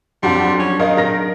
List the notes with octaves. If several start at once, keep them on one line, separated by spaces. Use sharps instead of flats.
F2 F#3 G3 D4 F#4 C6
C#4
D#3 A#4 D#5 F5
A#4 A#6